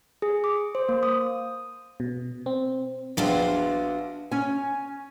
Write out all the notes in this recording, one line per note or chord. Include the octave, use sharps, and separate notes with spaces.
G#4
D6
C5
A#3
D#6
B2
C4
A#1 B3 D4 F4 F#4
C#4 G#5